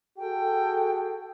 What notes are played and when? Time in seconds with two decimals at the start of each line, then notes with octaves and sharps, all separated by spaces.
0.18 F#4 G#4 A4 G5